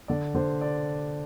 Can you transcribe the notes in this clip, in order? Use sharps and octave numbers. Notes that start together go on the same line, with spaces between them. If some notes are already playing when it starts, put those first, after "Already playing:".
D3 D5
D3 C5
D5